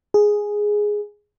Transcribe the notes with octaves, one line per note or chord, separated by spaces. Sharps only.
G#4